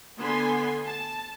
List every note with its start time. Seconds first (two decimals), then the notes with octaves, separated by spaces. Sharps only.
0.17 D3 B3 G#5 C6
0.85 A5